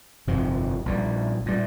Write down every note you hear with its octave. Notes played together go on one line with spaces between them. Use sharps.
G1 F2 C3 F3
A#1 A#2 G3
A#2 G3